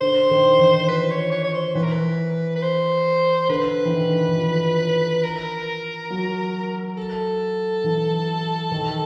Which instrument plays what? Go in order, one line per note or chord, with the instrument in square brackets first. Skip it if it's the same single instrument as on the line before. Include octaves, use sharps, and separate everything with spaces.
[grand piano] D3 [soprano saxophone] C5
[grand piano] D#3
E3
[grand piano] F3 [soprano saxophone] B4
[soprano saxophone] C#5
C#5
C#5
C5
[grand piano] E3 [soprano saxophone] B4
[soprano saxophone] A#4
B4
B4
C5
[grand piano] D3 [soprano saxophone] B4
[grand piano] E3
D#3
E3
F3
[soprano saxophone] A#4
[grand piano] F#3
[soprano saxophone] A4
[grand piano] E3
D#3